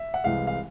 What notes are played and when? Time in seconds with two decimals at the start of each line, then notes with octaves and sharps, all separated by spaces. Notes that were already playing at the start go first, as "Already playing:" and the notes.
Already playing: E5
0.14 F#5
0.24 C2 C3 E3 G#3 F5
0.47 F5